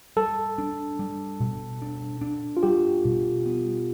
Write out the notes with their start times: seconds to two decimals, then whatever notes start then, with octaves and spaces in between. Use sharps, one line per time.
0.16 G3 A4
0.58 D4
0.99 G3
1.40 B2
1.82 D4
2.21 D4
2.57 F4
2.63 G3 G4
3.05 B2
3.46 B3